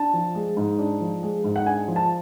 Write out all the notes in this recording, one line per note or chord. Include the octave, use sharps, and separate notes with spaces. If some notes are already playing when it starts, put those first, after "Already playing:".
Already playing: D4 A5
F3
G#3
G#2
D4
F3
G#3
G#2
F#5
D4 G#5
F3
A5